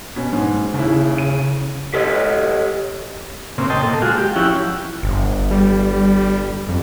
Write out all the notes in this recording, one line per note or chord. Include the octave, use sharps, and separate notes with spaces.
B2 C#4
G#2
D#2 C#3 E4
D#7
G4 A4 C#5 D#5
A#2 C#3 C4
D#5 G5 A5 C6
A#2 A4
G#3 F4 F#4
G4
F3 C#4 E4 F#5 G5
G1
G3
F2